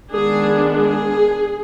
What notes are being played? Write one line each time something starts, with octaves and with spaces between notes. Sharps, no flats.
D#3 G#3 B3 D4 G#4
G#4